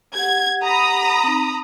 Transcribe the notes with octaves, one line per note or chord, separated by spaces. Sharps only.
G4 F#5 G#6
A#5 B5 D#6
C4 D#4